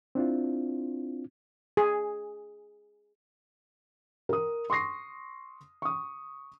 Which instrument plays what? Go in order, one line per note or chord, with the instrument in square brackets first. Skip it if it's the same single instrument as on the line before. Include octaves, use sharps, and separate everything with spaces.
[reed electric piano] C4 D4 E4 F4
[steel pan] G#4
[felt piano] A#4 D#6
C6 C#6 D#6 A#6 C7
C#6 D#6